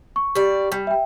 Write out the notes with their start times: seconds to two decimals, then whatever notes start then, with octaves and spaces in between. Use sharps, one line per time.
0.16 C#6
0.35 G3 D5
0.72 G3
0.87 E5 G5